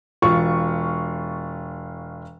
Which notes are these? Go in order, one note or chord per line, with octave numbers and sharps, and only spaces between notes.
E1 F4 C#6